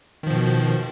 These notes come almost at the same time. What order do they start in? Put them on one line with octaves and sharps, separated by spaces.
D#3 F3 B2